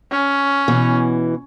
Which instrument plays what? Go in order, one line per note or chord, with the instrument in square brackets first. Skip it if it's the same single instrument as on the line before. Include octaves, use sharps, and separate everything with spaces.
[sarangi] C#4
[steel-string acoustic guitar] B2 E3